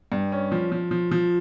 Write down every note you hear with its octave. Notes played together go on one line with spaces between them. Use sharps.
G2
C#4
F3
F3
F3
F3